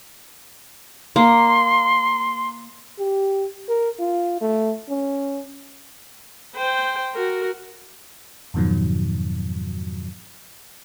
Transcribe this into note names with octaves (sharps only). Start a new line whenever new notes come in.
A#3 C6
G4
A#4
F4
A3
C#4
C5 G5
F#4 A#4
F2 G#2 B2 D#3 F3 F#3